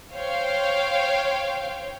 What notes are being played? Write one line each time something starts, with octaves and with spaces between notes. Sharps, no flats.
C5 C#5 F5 G5